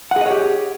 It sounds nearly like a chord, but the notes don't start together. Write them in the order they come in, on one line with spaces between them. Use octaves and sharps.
F#5 G#4 D#5 C#5 G4